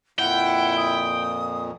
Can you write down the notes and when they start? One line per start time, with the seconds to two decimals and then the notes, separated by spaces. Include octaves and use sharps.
0.19 F2 A#2 E4 F#5 G5
0.77 D#6